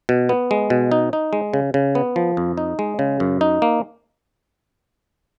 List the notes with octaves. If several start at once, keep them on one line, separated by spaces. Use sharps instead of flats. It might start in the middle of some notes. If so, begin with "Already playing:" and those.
B2
B3
G#3
B2
D#4
D#4
G#3
C#3
C#3
B3
F3
F2
D#4
G#3
C#3
F#2
D#4
A#3